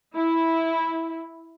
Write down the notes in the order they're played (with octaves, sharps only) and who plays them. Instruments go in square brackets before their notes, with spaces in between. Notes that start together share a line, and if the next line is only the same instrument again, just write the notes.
[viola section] E4